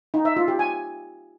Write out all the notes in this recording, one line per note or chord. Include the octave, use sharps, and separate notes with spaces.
D#4
E5
F4
G4
G#5